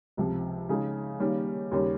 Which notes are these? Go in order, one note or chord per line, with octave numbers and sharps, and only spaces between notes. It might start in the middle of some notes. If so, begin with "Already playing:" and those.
C#2 C3 F3
C#3 G#3 D#4 G#4
D#3 G3 A#3 C#4
D#2 C#3 G3 C#4